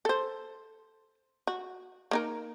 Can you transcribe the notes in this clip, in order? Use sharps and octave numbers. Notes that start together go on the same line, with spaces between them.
A4 C5
F#4
A#3 D#4 A#4